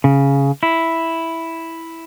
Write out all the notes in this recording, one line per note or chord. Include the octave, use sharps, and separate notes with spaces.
C#3
E4